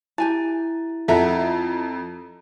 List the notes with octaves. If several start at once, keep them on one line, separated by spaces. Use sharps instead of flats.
E4 G4 G#5 A5
F2 A4 E5 F#5 A#5